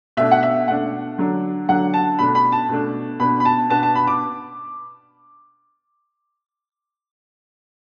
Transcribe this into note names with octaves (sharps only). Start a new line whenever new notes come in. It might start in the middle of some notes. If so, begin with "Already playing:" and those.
B2 A3 D4 E5
F#5
E5
B2 A3 D4 F#5
D3 F#3 D4
D3 F#3 D4 F#5
A5
B2 A3 D4 B5
B5
A5
B2 A3 D4
B2 B3 D4 B5
B5
A5
B2 B3 D4 A5
A5
B5
D6